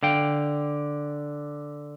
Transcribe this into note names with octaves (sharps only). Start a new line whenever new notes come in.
D3 F5 G5